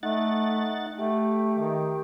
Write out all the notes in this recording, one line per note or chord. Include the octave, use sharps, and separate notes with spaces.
A3 D#4 F#5 A6
A3 G4
D#3